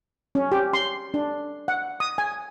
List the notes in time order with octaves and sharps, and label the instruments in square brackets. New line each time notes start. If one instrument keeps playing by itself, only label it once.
[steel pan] C#4
G4
C6
D4
F#5
D#6
G#5